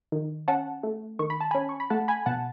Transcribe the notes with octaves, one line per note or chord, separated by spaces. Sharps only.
D#3
C#4 F#5 A5
A3
D#3 C#6
B5
A5
C#4 G#5 B5
C#6
B5
A3 F#5 A5
G#5 B5
B2 F#5 A5